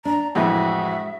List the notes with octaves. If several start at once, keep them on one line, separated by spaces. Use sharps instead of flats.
D4 A#5
F2 A2 E3 G#3 F#4 E5